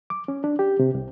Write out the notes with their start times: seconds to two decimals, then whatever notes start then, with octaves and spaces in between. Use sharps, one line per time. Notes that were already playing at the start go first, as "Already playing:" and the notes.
0.10 D6
0.28 C#4
0.44 D4
0.59 G4
0.79 C3
0.95 C2